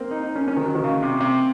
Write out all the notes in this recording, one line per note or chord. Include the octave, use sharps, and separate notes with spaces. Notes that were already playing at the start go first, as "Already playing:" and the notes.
Already playing: A#3 C4
D#4
D#4
C#4
C#4
D#3
F#3
D#3
C#3
C3
C3